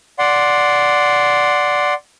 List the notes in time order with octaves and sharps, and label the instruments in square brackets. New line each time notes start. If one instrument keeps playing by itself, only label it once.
[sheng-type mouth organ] D5 F#5 C6